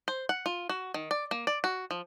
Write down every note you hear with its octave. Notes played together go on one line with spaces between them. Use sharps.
C5
F#5
F4
F#4
D#3
D5
A#3
D5
F#4
F3